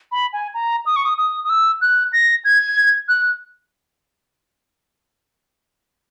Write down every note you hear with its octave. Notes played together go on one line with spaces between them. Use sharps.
B5
G#5
A#5
D#6
C#6
D#6
D#6
D#6
E6
F#6
A#6
G#6
F#6